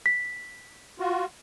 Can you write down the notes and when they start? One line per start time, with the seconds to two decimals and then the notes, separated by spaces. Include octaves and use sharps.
0.06 B6
1.00 F4 F#4